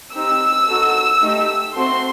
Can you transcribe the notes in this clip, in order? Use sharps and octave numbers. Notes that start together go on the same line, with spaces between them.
C4 D#4 G4 E6
D#4 F#4 A4
A3 D#4 G4
A3 C4 F#4 A4 C6